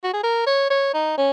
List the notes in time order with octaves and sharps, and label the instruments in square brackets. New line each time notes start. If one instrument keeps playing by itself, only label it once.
[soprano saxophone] F#4
G#4
A#4
C#5
C#5
D#4
C#4